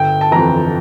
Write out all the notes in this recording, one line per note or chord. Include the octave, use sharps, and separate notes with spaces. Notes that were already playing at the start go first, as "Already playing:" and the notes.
Already playing: G1 G5
A5
F2 E3 A#5